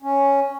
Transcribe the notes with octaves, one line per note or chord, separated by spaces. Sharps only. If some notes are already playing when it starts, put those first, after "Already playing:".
C#4